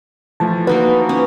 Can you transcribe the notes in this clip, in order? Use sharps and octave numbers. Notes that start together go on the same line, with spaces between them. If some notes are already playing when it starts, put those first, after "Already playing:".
E3 F3 A3 A5
A#3 D#4 F#4 B4
C#4